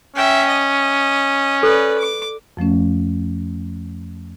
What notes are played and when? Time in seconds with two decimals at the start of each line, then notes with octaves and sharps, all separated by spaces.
0.16 C#4 E5 G5
0.48 D#5
1.63 A4 B4 D5
1.98 D6
2.57 F2 F3 A3 C#4